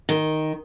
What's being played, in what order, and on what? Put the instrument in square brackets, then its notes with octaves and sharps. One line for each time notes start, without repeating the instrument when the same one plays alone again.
[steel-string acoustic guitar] D#3